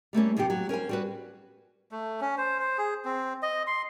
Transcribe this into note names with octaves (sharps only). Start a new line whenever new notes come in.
G3 A3 A#3 C#4
F#2 C3 F3 G4
F#3
C#4 A#4 C5 G#5
G3 F#4 B4
A3
C#4
C5
C5
G#4
C4
D#5
C6